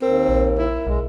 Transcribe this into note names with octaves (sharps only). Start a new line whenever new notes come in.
D#2 C4 A#4
A#1
E4
B1 G#3